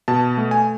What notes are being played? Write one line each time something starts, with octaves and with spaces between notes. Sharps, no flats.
B2 A5
A3
G#5